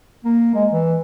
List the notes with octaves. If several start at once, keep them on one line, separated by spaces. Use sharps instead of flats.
A#3
G#3
E3